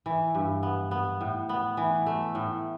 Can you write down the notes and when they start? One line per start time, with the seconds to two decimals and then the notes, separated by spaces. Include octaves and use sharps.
0.06 E3
0.35 G2
0.63 B3
0.91 B3
1.21 A2
1.49 B3
1.77 E3
2.06 A3
2.35 A2